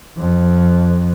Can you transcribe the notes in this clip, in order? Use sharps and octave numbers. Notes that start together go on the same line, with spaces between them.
F2